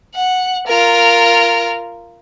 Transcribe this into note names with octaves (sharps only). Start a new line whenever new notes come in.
F#5
F4 A#4